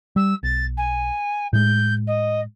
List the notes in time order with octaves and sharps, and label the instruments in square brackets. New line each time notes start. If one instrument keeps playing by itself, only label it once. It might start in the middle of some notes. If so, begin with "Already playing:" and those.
[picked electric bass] G3 [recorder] E6
[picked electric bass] B1 [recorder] A6
[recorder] G#5
[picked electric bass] A2 G#3 [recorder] G6
[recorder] D#5